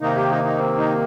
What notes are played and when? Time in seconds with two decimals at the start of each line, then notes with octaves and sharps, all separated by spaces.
0.01 C3 D#3 A#3 D#4
0.16 G4
0.30 D#4
0.44 D#4
0.59 C4
0.78 D#4